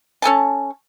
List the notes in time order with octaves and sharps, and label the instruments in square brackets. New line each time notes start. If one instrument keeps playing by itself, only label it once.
[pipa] C#4 A4 G#5 A5